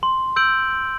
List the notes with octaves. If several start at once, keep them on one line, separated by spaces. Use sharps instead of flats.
C6
E6 G6 D7 F#7